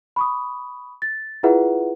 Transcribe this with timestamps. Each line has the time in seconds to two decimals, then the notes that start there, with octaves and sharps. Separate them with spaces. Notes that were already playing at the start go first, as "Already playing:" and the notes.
0.16 B5 C#6 D#6
1.02 A6
1.43 E4 F4 G#4 B4 E5 F#5